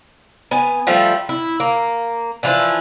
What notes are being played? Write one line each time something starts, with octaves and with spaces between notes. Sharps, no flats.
B3 G#5
F3 G3 A3
E4
A#3
E3 F3 D4 E4